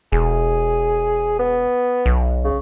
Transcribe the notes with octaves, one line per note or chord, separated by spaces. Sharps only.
E1 G#4
B3
B1
C#3